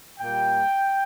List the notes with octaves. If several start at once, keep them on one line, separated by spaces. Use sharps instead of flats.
A#2 G3 A#3 G5